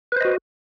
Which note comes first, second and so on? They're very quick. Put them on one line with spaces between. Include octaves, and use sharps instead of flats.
B4 C5 D#5 F#4